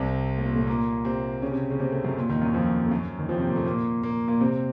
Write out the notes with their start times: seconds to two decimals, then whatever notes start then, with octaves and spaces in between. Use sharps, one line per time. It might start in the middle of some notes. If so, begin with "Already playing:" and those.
Already playing: C2 C3
0.38 A2
0.43 A#2
0.56 A2 A3
0.67 A#2 A#3
1.05 C3 C4
1.42 C#3 C#4
1.52 C3 C4
1.70 C#3 C#4
1.80 C3 C4
1.92 A2 A3
2.04 F#2 F#3
2.17 A#2
2.29 D#2 D#3
2.42 F#2 F#3
2.54 F2 F3
2.86 A3
2.91 F#2 F#3
3.19 D#3
3.29 F2 F3
3.38 C3 C4
3.47 A#2 A#3
3.56 A2 A3
3.65 A#2 A#3
4.03 A#2 A#3
4.28 A#2 A#3
4.40 C3 C4